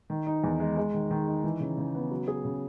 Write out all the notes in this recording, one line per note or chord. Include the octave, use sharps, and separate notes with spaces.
D#3
D#4
E2
G#3
G#3
D#3
D#3
D#4
E3
C#3
C#3
B3
F#3
G#4
C#3